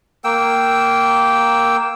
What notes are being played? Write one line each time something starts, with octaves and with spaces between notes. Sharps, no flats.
A#3 G5 E6